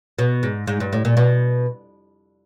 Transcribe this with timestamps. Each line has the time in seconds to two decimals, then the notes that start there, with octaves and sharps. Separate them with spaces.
0.19 B2
0.43 G#2
0.67 G#2
0.80 G2
0.93 A2
1.05 A#2
1.17 B2